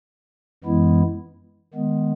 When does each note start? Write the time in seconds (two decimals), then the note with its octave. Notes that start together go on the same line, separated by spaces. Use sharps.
0.64 F#2 E3 G#3 B3 E4
1.74 D#3 G#3 B3